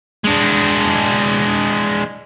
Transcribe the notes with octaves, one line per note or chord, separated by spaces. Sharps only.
G#3 D4